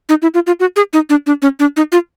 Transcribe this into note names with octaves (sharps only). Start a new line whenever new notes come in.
D#4
E4
F4
F4
F#4
G#4
D#4
D4
D4
C#4
D4
D#4
F4